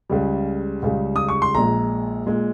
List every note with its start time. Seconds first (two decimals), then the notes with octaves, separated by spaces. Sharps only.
0.10 C#2 C#3 G3
0.82 C#2 C#3 G3
1.16 D#6
1.29 C#6
1.42 C6
1.54 A#1 A#2 G#3 A#5
2.27 A#2 G#3